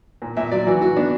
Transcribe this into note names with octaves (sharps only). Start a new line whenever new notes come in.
A#2
A#2 E5
F#3 D5
E3 F#4
E3 F#4
B3 D4